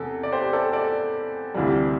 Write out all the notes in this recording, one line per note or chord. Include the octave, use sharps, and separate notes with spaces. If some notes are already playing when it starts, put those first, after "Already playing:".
Already playing: E2 C3 A4
D5
G4 C5
A4 D5
A4 D5
D2 C3 E3 G3